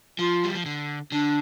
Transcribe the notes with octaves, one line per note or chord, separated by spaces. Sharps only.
F3 F4
G3
F3
D3
D3 D4